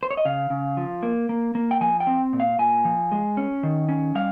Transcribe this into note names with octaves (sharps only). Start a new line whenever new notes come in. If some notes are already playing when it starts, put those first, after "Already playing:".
C5
C#5
D#5
C#3 F5
C#3
F3
A#3
A#3
A#3
G5
F3 G#5
G5
C4
A#2
F5
A#2 G#5
F3
G#3
C#4
D#3
C#4
G3 F5